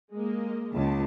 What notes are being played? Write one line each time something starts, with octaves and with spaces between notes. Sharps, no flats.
G#3 A#3 D#5
C#2 A5